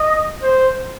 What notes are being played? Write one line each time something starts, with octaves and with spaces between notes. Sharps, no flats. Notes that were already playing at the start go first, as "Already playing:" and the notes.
Already playing: D#5
C5